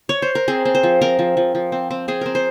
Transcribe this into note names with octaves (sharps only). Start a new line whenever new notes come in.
C#5
C5
A#4
C4 G#4
C4
C5
F3
C4 A#4
F3
F3
F3
C4
C4
C4 G#4
C4 A#4
C5